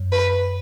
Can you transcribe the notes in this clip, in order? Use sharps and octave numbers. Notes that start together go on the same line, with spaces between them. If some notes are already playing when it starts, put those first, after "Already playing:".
Already playing: F#2
B4